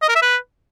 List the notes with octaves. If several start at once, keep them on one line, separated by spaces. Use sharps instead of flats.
D#5
A#4
E5
B4